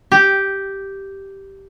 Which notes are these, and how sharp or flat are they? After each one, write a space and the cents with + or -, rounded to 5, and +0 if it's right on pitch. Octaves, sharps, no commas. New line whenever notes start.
G4 -5